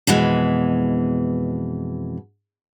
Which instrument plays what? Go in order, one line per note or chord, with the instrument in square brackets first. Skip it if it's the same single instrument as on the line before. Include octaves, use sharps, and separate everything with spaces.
[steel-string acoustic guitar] F2 B2 E3 G#3